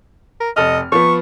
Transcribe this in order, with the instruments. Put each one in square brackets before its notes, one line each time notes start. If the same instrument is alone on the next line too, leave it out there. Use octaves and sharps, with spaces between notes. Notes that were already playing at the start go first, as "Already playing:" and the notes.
[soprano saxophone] A#4
[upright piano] F1 A4 F6 [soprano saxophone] D#5
[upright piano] F3 B3 [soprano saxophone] C#6